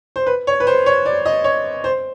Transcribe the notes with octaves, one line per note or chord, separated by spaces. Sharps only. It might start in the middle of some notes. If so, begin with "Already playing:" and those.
C5
B4
C#5
B4
C5
C#5
D5
D#5
C#5
C5